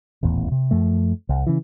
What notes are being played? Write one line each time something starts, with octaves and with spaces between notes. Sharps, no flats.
D#1 A1 E2
C3
F#2 F3 A3
C2
C#3 E3